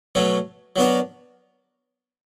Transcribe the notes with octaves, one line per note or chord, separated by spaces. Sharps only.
B2 F#3 A3 C#4
F#3 B3 D4 F#4 A#4